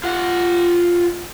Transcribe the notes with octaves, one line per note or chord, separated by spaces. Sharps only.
F4 F#5